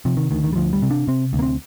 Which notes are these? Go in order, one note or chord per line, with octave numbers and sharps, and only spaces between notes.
C3 F3
D#3
D2 D#3
D#3
G3
D2 F3
G3
C3
D4
C3 C4
D2
A#3
C4